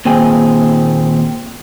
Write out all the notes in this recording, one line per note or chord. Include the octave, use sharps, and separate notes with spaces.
D#2 A#2 C4 G#4